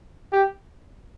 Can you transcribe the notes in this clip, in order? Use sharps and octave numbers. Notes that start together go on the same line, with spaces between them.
G4